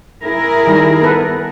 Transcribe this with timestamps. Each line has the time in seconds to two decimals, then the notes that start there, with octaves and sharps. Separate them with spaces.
0.23 E4 G#4 A#4
0.67 D#3 G3
1.02 B3 A4 B4